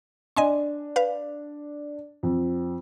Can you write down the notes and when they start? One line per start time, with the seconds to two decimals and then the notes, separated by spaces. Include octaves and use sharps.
0.36 D4 D#5 G#5 C6
0.96 B4 F5
2.23 F2